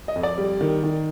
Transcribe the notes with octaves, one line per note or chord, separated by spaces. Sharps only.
D#5
F2
D5
G3
D#3
D#3